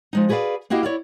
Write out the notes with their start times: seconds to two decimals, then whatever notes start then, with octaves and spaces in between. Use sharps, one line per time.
0.13 F3 G#3 D#4
0.29 F#4 G#4 B4 C5 D5 F5
0.70 A#3 E4 F#4 G4 D#5 F5
0.83 E4 C#5 D5 F5